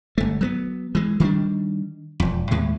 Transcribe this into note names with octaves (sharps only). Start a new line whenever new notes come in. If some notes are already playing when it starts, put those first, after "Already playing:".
G1 A3
F#3 A3 B3
E3 G#3
D#3 G3 A3 D4
E1 F2
D#2 A2 G#3